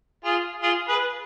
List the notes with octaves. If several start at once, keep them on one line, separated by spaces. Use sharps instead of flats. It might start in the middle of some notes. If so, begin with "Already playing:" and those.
F4 G#4
F4 G#4
G#4 B4